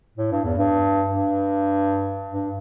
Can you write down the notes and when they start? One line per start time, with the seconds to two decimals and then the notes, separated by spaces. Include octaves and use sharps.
0.18 A2
0.32 G2
0.44 E2
0.58 G2
1.11 G2
2.31 G2